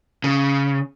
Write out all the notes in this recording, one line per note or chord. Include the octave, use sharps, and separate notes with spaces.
C#3